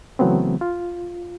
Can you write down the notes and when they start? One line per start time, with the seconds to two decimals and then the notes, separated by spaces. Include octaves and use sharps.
0.19 C#3 E3 F#3 A3 B3 C4
0.61 F4